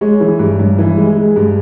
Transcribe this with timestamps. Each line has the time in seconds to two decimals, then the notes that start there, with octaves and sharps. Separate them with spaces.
0.01 G#3 C#5
0.20 E3
0.39 G2
0.59 G2
0.78 E3
0.97 G#3
1.16 G#3
1.36 G2